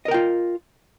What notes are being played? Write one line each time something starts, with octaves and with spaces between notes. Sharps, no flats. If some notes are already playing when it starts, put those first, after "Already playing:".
F4 A#4 D#5 G5